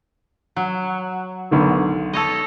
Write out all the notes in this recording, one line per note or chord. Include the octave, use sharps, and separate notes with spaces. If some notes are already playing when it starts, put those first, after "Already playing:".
F#3
B1 D3 D#3
A4 C#5 D#5